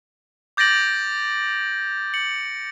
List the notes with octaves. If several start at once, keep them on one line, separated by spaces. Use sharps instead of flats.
D6 G6 A6 A#6 D7 F#7
C#7 F#7